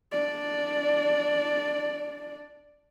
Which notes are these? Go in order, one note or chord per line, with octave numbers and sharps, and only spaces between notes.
D4 D5